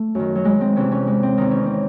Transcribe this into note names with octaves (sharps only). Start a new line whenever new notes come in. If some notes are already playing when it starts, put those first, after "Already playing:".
Already playing: A3
F#2 D#3
F#3
G#3
C4
E2 C3 E3 C#4
C#4
G#3
C4
E2 D#3 D#4
C#4
C4